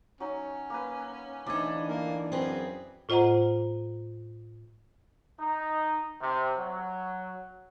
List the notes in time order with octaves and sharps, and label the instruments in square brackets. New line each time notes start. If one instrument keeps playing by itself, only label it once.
[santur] F#3 D#4 [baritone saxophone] C#4
[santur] A#3 B4
[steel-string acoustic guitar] D2 D#4 [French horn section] E3 D4 [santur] D5 E5 G#5
[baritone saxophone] A#3
[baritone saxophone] F#2 [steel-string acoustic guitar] C4 G#4 B4 [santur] D#5
[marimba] A2 F4 C5 D#5 F#5 A#5
[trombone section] D#4
C3
F#3